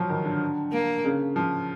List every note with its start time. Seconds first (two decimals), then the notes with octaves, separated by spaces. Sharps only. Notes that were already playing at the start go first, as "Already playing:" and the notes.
Already playing: F3 F#3
0.10 D#3
0.25 D3
0.72 A#3
1.05 C#3
1.36 F3